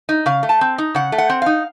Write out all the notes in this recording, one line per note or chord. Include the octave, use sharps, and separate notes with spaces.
D#4
C#3 F5
A3
A5
C4
D#4
C#3 F#5
A3
F#5
C4
D#4 F5